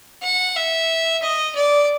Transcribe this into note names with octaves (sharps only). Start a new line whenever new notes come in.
F#5
E5
D#5
D5